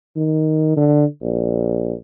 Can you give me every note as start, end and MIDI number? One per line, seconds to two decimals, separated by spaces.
0.16 0.76 51
0.76 1.05 50
1.22 1.93 34